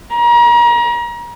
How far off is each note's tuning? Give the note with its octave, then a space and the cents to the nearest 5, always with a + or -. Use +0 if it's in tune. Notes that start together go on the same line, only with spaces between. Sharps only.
A#5 +35